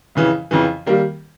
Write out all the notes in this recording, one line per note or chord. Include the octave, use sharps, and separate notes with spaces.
F2 C#3 E3
F2 C#3 E3
D#3 G3 A#3